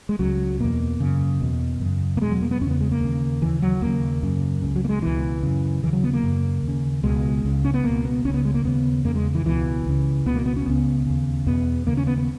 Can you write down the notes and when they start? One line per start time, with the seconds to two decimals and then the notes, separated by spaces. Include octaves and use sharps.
0.09 G#3
0.19 C#2 C#3 F#3
0.60 E2 B2 A#3
1.00 F#2 C#3
1.41 E2 B2
1.81 F#2 C#3
2.17 A#3
2.21 E2 B2 G#3
2.31 F#3
2.42 A#3
2.51 B3
2.61 E2 C#4
2.66 C#3
2.71 B3
2.81 G#3
2.92 A#3
3.01 D#2 C#3
3.42 D#2 C#3 E3
3.62 F#3
3.81 D#2 C#3 A#3
4.23 F#2 C#3
4.62 C#2 C#3
4.76 F#3
4.85 A#3
4.89 G#3
5.02 C#2 B2 E3
5.43 F#2 C#3
5.83 D#2 C#3 E3
5.93 F#3
6.04 B3
6.13 A#3
6.23 F#2 C#3
6.63 D#2
6.68 C#3
7.04 C#2 B2 G#3
7.44 C#2 C#3
7.64 C#4
7.74 B3
7.84 C#2 B2 A#3
8.05 B3
8.25 C#2 C#4
8.29 C#3
8.34 B3
8.45 G#3
8.54 A#3
8.64 D#2 C#3 B3
9.05 E2 C#3 A#3
9.15 G#3
9.35 E3
9.45 C#2 B2 E3
9.86 C#2 C#3
10.26 C#2 B2 B3
10.36 A#3
10.46 B3
10.56 C#4
10.66 C#2 C#3 B3
11.06 D#2 C#3
11.46 E2 B2 B3
11.87 D#2 C#3 A#3
11.97 C#4
12.07 B3
12.18 B3